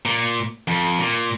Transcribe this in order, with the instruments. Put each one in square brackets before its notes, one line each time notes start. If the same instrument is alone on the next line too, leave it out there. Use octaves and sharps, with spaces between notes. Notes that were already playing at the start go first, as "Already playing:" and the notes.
[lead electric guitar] A#2
F2
A#2